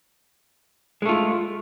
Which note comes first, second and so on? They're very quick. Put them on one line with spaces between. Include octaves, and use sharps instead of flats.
G#3 A3 F4